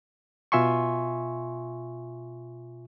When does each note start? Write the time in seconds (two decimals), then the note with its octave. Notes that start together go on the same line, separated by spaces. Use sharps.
0.52 B2 F4 E5 G#5 C6 C#6